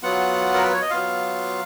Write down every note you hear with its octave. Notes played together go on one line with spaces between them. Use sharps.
F#3 B3 F4 F#5
A#4
B4
C#5
D#5
F#3 B3 F4 F5